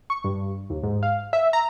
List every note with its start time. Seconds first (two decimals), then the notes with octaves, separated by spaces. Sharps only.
0.10 C#6
0.24 G2
0.70 D#2
0.83 G#2
1.03 F5
1.33 E5
1.53 A#5